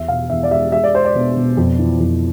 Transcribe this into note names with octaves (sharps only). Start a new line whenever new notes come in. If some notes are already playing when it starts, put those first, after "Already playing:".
Already playing: E2 E5
B2 F5
E2 E5
D5
G#3 E5
G#3 E5
D5
G#3 C5
D5
B2
B2
F2
E3
F2